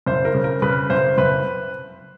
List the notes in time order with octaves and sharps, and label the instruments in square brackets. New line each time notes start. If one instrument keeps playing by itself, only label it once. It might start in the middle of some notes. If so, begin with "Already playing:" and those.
[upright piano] F#1 C5
A#4
C#3
A#4
C#3 B4
F#1 C5
F#1 B4